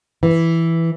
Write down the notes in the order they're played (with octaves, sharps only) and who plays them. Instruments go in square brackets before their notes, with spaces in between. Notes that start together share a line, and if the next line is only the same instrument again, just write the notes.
[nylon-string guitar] E3